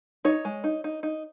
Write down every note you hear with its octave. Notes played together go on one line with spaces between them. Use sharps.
D#4 C#5
G#3
D#4
D#4
D#4